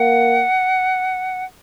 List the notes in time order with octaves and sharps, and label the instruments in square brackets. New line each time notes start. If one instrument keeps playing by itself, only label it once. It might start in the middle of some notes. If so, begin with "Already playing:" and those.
Already playing: [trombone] A#3 [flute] F#5